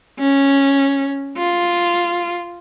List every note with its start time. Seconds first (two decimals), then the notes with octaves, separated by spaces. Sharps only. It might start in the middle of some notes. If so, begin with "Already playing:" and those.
0.19 C#4
1.37 F4